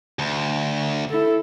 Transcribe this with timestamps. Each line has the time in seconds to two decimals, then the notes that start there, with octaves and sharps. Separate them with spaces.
0.19 D2
1.09 E4 A4